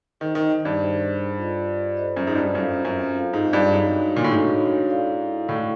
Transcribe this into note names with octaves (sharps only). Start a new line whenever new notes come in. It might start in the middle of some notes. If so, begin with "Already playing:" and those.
D#3 D#4 G#4 C5
D#3
G2
D#4 G#4 C5
F4 A4 C5 D#5
F4 A4 C5 D#5
F#2
G#2
G2
F#2 C4 F4 A4 C5 F5
F#2
C4 F4 A4 C5 F5
G#2
G2
G#2 D4 F#4 A4 C#5 F5
A#2
A2
G#2 D4 F#4 A4 C#5 F5
E4 A4 D5 F5
A2 E4 A4 D5 F5